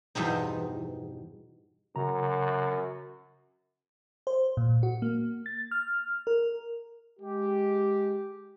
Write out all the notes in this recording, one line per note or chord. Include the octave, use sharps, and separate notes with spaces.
E2 G2 B2 C4 D#4
F#2 C#3 A#5
C5
A#2
F#4
A#3
A6
F6
A#4
G#3 G4